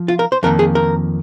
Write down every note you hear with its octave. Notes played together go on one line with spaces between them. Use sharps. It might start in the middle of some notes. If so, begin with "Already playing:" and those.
Already playing: F3
F4
A#4
C5
F2 D#3 A#3 A#4
G#4
A#4